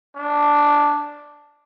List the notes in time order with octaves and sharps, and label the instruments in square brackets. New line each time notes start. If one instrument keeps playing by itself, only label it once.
[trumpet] D4